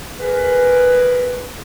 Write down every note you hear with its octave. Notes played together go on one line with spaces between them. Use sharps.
G#4 A#4 B4